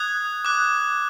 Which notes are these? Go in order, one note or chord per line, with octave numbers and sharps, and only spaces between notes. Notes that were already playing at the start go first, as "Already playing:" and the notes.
Already playing: D#6 F#6 G#6
D6 F#6